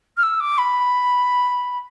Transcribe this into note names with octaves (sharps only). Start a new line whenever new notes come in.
F6
E6
D6
B5